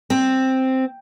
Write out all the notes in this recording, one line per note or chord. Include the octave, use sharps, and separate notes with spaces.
C4